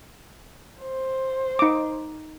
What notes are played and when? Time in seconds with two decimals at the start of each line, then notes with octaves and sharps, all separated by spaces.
0.83 C5
1.59 D#4 D6